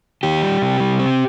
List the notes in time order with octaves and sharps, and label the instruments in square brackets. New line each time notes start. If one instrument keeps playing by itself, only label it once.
[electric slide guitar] D#3 G4
G3
C3
G3
C4